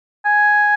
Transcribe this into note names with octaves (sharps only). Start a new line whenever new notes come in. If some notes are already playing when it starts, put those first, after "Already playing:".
G#5